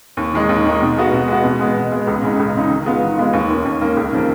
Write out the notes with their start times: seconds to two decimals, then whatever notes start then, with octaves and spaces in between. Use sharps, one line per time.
0.17 D#2
0.33 D#3 G#3 D#4
0.49 D#2
0.65 D#3 G#3 D#4
0.81 B2
0.97 G#3 B3 F#4
1.12 B2
1.28 G#3 B3 F#4
1.43 B2
1.60 G#3 B3
1.76 B2
1.92 G#3 B3
2.07 C#2
2.23 C#3 G#3 D#4
2.39 C#2
2.54 C#3 G#3 D#4
2.70 D#3
2.86 G#3 B3 F4
3.02 D#3
3.17 G#3 B3 F4
3.33 D#2
3.49 D#3 A#3 C#4
3.65 D#2
3.80 D#3 A#3 C#4
3.97 C#2
4.12 C#3 F3 A#3